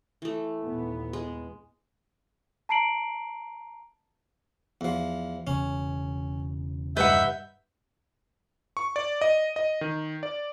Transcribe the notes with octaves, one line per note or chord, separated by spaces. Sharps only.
E3 A3
D#2 A#2 B3
G#3
A5 A#5 C7 D7 F#7
E2 F3
E1 C#3 C#4
G2 D#3 B4 E5 F#5 G6
C#6
D5
D#5
D#5
D#3
D5